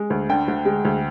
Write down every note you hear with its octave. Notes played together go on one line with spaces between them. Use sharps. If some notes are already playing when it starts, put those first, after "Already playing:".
Already playing: G#3
D2
D3 G5
D2
G#3
D2